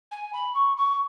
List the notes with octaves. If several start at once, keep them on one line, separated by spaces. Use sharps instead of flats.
G#5
B5
C#6
C#6